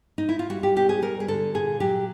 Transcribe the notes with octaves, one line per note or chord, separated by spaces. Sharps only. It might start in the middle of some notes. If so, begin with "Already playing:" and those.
D#4
E4
F4
G3 F#4
G4
B2 G4
G#4
G3 A#4
G#4
D3 A4
A#2 G#4
F#3 G4